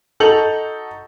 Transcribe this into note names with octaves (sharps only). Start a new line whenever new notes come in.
D#4 F#4 A4 G6 F7 F#7